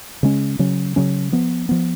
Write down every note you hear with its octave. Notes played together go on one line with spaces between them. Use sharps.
C#3 G#3 C#4
C#3 F#3 C#4
C#3 F#3 C#4
F3 B3
F3 B3